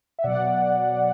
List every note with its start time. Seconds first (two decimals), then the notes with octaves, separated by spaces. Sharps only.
0.19 E5
0.24 B2 F#3 D5 F#5